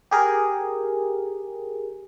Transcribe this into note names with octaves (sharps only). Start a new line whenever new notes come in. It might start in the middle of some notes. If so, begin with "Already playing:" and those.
G4 G#4 A#4